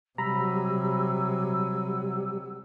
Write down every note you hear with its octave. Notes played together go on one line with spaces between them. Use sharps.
C3 F#3 G3 F#5 G#5 A#5 B5 E6